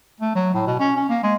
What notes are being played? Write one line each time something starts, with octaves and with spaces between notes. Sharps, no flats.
A3
F#3
A2
B2
C#4
C#4
A#3
G#3